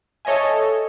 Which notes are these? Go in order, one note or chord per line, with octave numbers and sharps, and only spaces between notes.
A4 C#5 D#5 E5 G#5